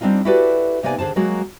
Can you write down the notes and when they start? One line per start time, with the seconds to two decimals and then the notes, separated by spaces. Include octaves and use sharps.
0.01 G3 C4 D4 D#4 F4
0.25 E4 F#4 G4 A4 B4 D5
0.83 C3 A#3 B3 D#4 D5 G#5
0.98 D#2 D3 G#4 C5 A5
1.16 F#3 G#3 A#3 F#4